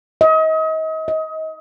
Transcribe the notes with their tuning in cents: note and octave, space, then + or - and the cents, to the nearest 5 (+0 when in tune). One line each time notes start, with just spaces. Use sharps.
D#5 +35
D#5 +25